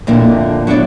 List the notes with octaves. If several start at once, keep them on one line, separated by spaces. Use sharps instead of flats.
F2 A#2 D3 A#3 E4
F#3 B3 D4 E4 D5